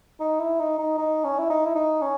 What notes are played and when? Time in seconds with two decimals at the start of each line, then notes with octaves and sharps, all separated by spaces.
0.20 D#4
0.40 E4
0.60 D#4
0.79 D#4
0.98 D#4
1.24 C#4
1.39 E4
1.50 D#4
1.66 E4
1.75 D#4
2.02 C#4